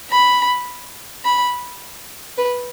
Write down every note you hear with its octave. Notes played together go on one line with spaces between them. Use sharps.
B5
B5
B4